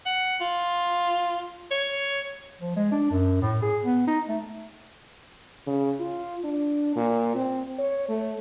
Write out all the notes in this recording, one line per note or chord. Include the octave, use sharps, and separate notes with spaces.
F#5
F4
C#5
F3
G#3
D4
F#2
A2
G#4
B3
D#4
A3
C#3
F4
D4
A#2
C4
C#5
A3